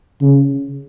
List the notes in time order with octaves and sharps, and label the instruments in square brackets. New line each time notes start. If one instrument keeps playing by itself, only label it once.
[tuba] C#3